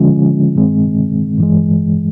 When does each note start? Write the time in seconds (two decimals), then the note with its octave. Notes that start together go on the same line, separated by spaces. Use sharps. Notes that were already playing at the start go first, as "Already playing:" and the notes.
Already playing: D3 F3 G#3 C#4 F4
0.55 G2 D#3 G#3 C4
1.38 G2 E3 G#3